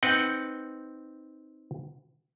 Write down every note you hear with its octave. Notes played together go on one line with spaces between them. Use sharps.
C4 D#4 B4 F#5 G5